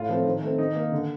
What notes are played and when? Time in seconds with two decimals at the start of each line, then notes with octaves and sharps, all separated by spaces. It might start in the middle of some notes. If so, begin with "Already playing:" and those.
Already playing: A2 F4
0.09 F3 A3 C4
0.26 D#3
0.42 A3 C4
0.58 D#3 D#4
0.76 A#3
0.92 D3